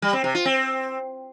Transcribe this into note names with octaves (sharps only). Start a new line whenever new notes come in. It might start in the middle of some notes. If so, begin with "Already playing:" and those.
G3
C4
C3
F4
C4